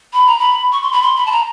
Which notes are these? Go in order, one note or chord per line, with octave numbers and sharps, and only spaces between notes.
B5
A#5
B5
C#6
C6
B5
C6
B5
A5
A#5